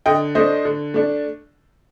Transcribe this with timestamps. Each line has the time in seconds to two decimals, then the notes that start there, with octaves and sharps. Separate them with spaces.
0.06 D3 D#5 G5
0.35 A3 D4 C5 D#5
0.65 D3
0.94 A3 D4